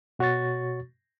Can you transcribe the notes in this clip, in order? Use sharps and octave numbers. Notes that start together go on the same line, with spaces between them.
B2 F#4 C#5 C#6 A6